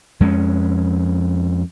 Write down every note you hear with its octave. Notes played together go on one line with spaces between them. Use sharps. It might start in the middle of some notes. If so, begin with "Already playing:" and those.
F2 G#3 A#3 C#4